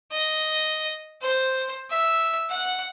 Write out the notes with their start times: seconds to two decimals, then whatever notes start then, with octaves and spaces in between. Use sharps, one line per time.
0.12 D#5
1.22 C5
1.90 E5
2.50 F#5